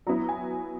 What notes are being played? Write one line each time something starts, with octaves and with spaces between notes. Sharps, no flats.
F#3 B3 E4 A#5
G#5